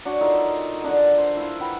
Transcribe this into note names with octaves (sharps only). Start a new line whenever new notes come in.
D4 F#4 C#5 D5
D#4 F4 A4 A#4
D3 D4
C5
E4 F4
B4 F#5 G5 B5